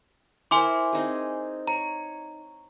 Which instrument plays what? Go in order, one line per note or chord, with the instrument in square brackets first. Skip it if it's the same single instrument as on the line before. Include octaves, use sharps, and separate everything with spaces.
[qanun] E4 A#4 C5 [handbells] G#5 C6 D6
[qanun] C4 D#4 G#4
[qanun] C#5 [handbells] A#5